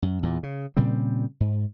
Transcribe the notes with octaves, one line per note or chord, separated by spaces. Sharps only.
F#2
E2 A#2
C#3
A#2 C#3 G3 C4
G#2